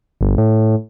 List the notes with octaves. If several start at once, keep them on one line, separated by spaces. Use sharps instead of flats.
G1
A2